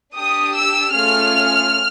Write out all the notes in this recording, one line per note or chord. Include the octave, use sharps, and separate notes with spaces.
D4 G4 D#6
E6
A3 C#4 F4 G#4 F6